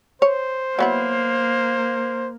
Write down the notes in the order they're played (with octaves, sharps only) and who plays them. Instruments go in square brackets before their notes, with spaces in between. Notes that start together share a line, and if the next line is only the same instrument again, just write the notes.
[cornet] C5 [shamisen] C#5
[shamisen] F#3 B3 E4 [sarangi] A#3